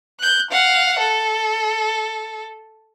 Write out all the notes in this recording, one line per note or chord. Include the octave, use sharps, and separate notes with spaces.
F#6 G6
F5 F#5
A4